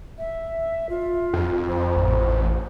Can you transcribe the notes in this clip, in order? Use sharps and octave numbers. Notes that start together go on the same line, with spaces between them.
E5
F4
F2
C5
A1